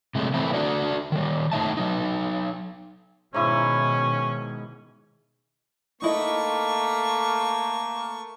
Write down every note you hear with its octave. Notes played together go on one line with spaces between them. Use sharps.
C3 G#3 A3
E3 A3 C4 E4
D4 F#4 A4 D5
D#3 G3
A3 D#4 E5 A5
F#3 D#4
G#2 B2 D#3 C#4 E4
A3 A#3 D#4 E4 D#5 C#6